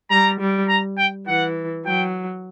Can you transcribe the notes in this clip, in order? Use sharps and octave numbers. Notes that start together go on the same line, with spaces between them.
G3 A#5
G3
A#5
G5
E3 F#5
F#3 G5